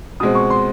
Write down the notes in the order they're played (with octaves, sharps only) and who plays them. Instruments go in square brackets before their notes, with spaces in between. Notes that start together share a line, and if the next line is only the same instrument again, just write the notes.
[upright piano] B2 G#3 C4 D#6
C#6
C6